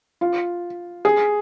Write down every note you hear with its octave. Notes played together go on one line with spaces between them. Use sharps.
F4
G#4